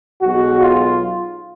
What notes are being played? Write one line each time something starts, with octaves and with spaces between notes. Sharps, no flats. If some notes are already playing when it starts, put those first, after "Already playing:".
B1 B2 G#3 F#4
F4